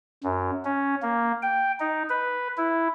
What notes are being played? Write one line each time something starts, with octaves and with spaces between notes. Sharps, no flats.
F#2
C#4
A#3
G5
D#4
B4
E4